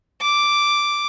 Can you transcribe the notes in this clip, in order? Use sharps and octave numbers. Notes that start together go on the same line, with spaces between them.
D6